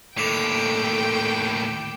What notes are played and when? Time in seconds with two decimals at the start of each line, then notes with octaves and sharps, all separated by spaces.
0.18 D#2 A2 A4 G5 D6 E7 F7